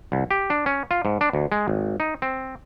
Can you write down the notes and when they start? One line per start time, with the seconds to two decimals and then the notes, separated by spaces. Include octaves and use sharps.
0.12 C2
0.31 G4
0.50 D4
0.66 C#4
0.91 F4
1.05 G#2
1.21 D4
1.33 D2
1.52 G#3
1.68 G#1
2.00 D#4
2.22 C4